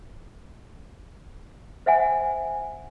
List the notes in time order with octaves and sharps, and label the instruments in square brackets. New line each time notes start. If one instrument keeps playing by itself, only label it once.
[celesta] C5 E5 F#5 G#5